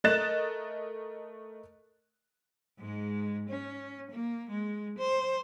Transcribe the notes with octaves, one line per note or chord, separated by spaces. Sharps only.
A3 A#4 D#5 F#6 A6 E7
G#2 G#3
C#4
A#3
G#3
C5